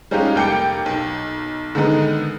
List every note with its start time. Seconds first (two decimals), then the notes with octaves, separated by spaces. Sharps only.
0.11 G3 G#3 C#4 D#4 F4 G4
0.35 F1 A#3 G5 D6 C#7
0.86 B1
1.75 D3 D#3 G#3 B3 D#4